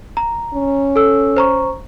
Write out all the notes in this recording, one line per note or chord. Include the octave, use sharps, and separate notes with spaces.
A#5
C#4
A4 E6
C5 A#5 C#6